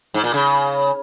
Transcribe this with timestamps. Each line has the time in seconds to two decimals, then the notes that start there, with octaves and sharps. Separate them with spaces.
0.14 G#2
0.24 A#2
0.34 C#3